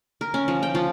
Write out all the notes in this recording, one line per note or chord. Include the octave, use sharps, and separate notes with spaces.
A#4
C#4
F3
G5
F3